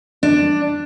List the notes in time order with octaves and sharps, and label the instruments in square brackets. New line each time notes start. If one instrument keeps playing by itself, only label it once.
[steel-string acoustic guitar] D4